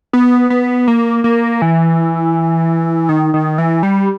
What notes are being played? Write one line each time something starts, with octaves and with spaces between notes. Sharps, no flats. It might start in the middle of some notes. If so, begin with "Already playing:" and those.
B3
B3
A#3
A#3
E3
D#3
D#3
E3
G3